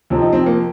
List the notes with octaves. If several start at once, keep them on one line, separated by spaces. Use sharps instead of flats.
F2 C3 F3 C4
D#4
C4
A#3